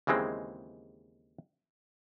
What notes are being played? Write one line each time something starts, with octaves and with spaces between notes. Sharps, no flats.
D#2 C#3 E3 G#3 C4